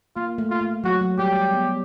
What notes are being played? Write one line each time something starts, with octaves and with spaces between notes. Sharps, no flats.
A#3 F4
A3
F4
A3
F#3 F#4
F#3
G3 G4
G#3
B3